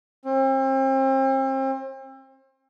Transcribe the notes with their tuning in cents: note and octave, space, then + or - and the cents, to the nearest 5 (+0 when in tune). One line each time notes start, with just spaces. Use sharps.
C4 +35